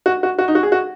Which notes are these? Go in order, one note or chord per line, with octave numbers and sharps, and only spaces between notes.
F#4
F#4
F#4
D#4
F#4
G#4
F#4